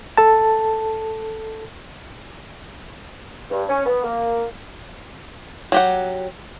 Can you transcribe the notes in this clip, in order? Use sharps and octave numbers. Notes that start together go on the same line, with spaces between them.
A4 A5
G2
C#4
B3
A#3
F#3 G4 F#5